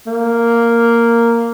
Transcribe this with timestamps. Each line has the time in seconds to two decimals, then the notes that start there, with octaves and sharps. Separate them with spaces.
0.07 A#3